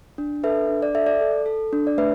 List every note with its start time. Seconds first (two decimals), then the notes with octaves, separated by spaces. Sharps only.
0.18 D4
0.44 A4 B4 E5
0.69 D4
0.82 D5
0.95 A4 E5
1.07 D5
1.21 A4
1.46 A4
1.73 D4
1.87 D5
1.97 A3 B4 E5